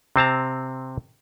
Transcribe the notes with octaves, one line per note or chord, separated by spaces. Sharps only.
C3 C4 A5 A#5